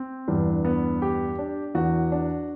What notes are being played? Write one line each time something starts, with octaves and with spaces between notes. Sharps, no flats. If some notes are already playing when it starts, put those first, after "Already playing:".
Already playing: C4
E2 G2 D4
B3
G4
D4
E2 F#4
D4